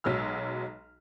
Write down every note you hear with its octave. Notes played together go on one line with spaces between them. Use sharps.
B1 F#3 G#3 E6 F6